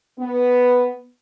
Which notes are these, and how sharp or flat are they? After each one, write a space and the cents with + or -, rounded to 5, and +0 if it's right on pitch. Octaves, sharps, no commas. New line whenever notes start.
B3 +0